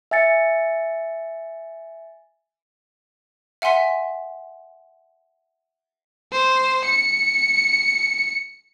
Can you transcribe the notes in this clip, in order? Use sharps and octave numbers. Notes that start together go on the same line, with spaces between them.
E5 G#5 A6 C#7
E5 F#5 G#5 C6 B6
C5
C#7